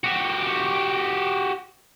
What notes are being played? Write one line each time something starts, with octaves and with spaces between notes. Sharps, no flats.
F#4 G4